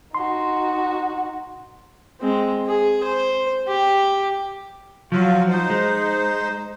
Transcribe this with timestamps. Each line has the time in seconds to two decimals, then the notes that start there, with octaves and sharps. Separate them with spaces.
0.15 D#4 F#4 C6
2.21 G#3 C4
2.67 G#4
3.03 C5
3.68 G4
5.12 F3 F#3 F4 F#4
5.48 D#4 C5
5.70 G#3